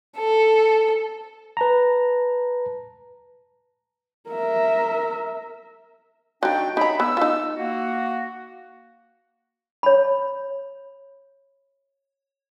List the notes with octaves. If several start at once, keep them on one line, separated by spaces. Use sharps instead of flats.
A4
B4 A5 A#5
A#4 E5
F#3 D4 D#4 F#4 G5
D#4 C#5 E5 A#5 B5
B3 E6
D#4 F4
A#3 F#4
C#5 B5